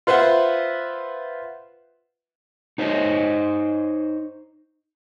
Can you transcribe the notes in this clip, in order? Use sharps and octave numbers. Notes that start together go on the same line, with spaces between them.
F4 B4 C5 E5 F#5
D#4 C5 C#5 D#5